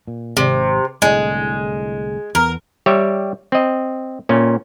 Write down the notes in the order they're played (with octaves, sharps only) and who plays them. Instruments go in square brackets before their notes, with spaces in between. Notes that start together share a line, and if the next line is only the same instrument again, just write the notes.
[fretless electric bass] A#2
[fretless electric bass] G#1 [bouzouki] C3
[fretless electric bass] C2 A2 D3 [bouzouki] G#3
[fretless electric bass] E2 B3 [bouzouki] A#4
[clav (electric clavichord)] G3 G4 C#5 E5
C4 D#5
A#2 C#4